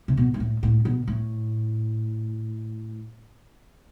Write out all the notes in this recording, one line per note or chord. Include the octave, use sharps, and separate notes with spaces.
C3
B2
G2
A2
A2
B2
A2